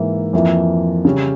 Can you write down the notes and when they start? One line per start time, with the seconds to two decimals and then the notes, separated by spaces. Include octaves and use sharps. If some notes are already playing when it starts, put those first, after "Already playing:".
Already playing: G#2 E3 A#3
0.33 F2 E3 A#3
1.05 C#3 G3 C#4